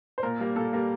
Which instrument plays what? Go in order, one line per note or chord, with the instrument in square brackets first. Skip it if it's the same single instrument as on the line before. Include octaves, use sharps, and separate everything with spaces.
[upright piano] C5
A#2 A#4
G3 A#3
A#2 A4
G3 A#3